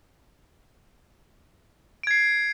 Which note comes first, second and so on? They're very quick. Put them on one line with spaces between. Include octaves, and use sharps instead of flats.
D7 G#6 C7